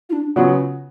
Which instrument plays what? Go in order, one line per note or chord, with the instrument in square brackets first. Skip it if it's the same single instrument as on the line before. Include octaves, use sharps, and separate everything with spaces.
[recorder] F4
D4
[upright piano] C#3 F#3 B3 F#4 [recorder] F4